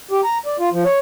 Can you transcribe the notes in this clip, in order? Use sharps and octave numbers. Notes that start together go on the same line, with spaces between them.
G4
A#5
D5
F4
F3
C#5